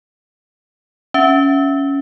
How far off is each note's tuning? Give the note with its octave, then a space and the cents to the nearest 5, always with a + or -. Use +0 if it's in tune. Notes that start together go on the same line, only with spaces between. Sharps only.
C#4 +5 E5 +15